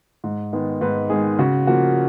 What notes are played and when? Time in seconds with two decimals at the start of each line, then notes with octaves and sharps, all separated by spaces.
0.24 G#2
0.53 D#3 G#3 B3
0.81 G#2 B4
1.10 D#3 G#3 B3 G#4
1.39 C#3 F#4
1.67 F3 A#3 F#4